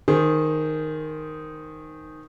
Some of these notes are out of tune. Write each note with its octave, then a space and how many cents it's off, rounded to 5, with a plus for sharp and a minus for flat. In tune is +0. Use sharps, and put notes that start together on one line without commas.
D#3 +0 G#4 +0 C5 +0